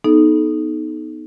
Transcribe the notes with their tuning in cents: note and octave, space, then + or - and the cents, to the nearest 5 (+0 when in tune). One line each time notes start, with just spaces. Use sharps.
B3 +0 D#4 +0 A4 -35